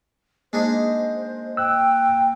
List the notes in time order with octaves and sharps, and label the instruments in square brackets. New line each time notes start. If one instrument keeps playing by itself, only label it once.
[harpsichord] G#3 D4 D#4 [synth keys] A#3 [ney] C5
[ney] G5 [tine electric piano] E6 F#6